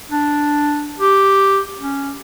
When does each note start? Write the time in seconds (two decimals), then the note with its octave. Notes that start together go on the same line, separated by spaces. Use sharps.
0.11 D4
1.00 G4
1.80 C#4